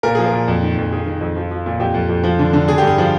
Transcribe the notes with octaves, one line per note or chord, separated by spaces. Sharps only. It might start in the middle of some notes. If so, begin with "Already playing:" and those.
A#2 A#4
F3 G#4
A#4
A#2
F2
D#3
F2
D#3 G#4
D#3
F2
F3
F3
A#2
F2 G4
F2
F2
F3
D3
D3
D3 G#4
G4
G2 G#4
F3